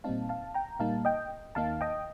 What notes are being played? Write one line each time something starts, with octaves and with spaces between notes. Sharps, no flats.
A#2 G3 C4 D#4 F5 A5
F5 A5
G5 A#5
A#2 G3 A#3 D#4 F5 A5
D#5 G5
D#2 D#3 A#3 D#4 F5 A5
D#5 G5